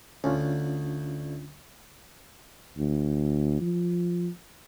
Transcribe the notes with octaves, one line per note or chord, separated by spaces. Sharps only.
D2 C#4 D4 F4
D2
F3